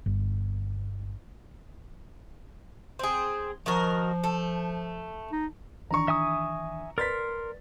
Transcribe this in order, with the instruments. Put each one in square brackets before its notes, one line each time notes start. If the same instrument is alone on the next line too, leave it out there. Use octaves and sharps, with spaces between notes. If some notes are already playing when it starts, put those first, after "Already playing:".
[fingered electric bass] G1
[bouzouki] C4 G#4
[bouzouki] D#3 F#4 A#4 [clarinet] F3
[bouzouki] A3
[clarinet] D#4
[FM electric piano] D#3 E3 D4 [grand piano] A#5 C#6
[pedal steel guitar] E5 G#5 D#6
[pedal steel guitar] A#4 C6 [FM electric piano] B4 D5 [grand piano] A6 B6